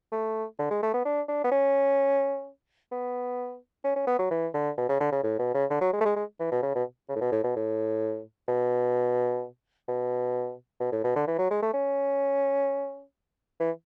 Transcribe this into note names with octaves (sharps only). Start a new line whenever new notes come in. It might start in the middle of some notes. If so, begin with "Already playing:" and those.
A3
D3
G#3
A3
B3
D4
D4
B3
C#4
B3
C#4
C#4
B3
F#3
E3
D3
B2
C#3
D3
C#3
A2
B2
C#3
D3
F#3
G#3
A3
G#3
G#3
E3
B2
C#3
B2
C#3
A2
B2
A2
B2
A2
B2
B2
B2
A2
B2
D3
E3
F#3
G#3
A3
C#4
E3